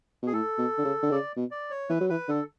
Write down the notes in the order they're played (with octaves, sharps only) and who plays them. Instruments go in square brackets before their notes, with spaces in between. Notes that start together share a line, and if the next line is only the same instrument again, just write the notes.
[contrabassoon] B2 [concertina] G#4
[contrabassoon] A2 [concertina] A4
[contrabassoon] B2
D3
C#3
D3
[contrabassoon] C#3 [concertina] D5
[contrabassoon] B2
[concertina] D5
C#5
[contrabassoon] E3 [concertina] B4
[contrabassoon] F#3
[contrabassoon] E3 [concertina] B4
[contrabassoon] D3 [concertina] A4